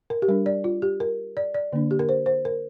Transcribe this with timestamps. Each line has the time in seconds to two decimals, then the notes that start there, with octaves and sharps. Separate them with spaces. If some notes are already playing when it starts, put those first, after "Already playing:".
0.10 A#4
0.22 G4
0.28 G3 D4 A#4
0.46 D5
0.64 F4
0.82 G4
1.00 A#4
1.37 D5
1.54 D5
1.73 D3 A#3 D4
1.91 G4
1.99 A#4
2.09 C5
2.26 C5
2.45 A#4